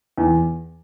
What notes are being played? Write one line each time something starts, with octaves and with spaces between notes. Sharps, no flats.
E2